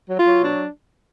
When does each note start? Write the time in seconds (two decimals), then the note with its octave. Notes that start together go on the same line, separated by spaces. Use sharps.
0.08 F#3
0.18 F4
0.25 F#3
0.41 B2 D4